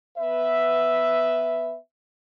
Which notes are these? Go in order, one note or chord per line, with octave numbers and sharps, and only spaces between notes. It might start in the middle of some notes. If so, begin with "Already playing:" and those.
B3 B4 E5